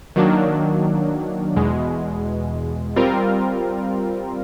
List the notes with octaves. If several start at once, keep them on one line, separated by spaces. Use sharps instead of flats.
D#3 F#3 A#3 D4
E2 B2 G#3
G3 C4 F4 A#4